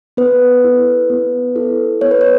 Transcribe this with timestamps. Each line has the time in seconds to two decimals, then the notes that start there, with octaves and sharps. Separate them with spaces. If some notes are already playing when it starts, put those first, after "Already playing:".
0.17 B3 B4
0.63 E4 A4
1.10 B3
1.56 E4 A4
2.01 B3 C#5
2.11 B4
2.21 C#5